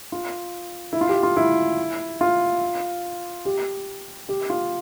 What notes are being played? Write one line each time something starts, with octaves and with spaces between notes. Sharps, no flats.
F4
E4
F4
G4
F4
E4
F4
G4
G4
F4